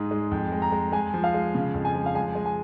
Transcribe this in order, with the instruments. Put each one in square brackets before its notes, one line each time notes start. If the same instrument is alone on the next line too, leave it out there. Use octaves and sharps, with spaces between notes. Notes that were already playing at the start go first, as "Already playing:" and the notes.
Already playing: [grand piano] G#2 G#3 D#6
G#3
F2
G#3
A#5
G#3
G#3 G#5
F3
F5
G#3
C#3
F2
G#5
F3
F5
G#3 G#5
G#3
G#5